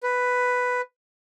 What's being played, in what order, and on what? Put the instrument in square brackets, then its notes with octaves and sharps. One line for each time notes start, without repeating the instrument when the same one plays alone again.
[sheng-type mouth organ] B4